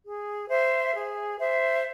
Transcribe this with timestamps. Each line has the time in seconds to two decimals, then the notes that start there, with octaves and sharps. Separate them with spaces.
0.04 G#4
0.49 C5 E5
0.95 G#4
1.39 C5 E5